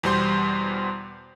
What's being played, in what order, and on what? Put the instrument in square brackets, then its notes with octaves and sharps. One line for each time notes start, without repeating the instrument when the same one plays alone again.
[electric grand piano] E2 B2 G3 C5 C6 G6